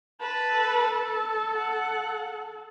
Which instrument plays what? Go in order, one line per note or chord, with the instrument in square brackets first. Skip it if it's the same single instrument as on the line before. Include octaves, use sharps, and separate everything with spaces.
[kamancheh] B4 A5
[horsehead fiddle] A4
[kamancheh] F#5